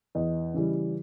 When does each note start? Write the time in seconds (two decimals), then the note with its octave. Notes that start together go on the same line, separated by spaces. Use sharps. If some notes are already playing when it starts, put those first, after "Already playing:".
0.15 E2 D#5
0.54 C#3 E3 G3